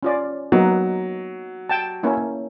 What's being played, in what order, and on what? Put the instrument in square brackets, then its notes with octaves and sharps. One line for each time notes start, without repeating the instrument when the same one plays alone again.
[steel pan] C#4 F4 D5
[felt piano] F#3 [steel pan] A#3 B3 D#4
[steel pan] G5 A5
A#3 C#4 E4